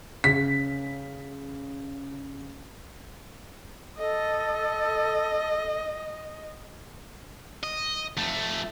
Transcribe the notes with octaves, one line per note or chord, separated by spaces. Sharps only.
C#3 B6
A4 D#5
D#5
F2 A3